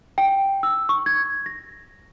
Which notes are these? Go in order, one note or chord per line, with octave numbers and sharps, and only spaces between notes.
G5
E6
C#6
G#6
A#6